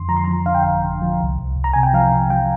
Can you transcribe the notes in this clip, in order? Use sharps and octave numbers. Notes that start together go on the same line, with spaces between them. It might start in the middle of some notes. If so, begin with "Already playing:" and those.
Already playing: F2 D3 C6
F3 A#5
C6
A#5
F3
D3 F5
G5
G1 F5
D3
F3
C2
C2
C2
A#5
C3 G#5
G5
F3 F5
C3
F3 G5